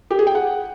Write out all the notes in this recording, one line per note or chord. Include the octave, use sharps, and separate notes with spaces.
G4
G#4
G5
F#5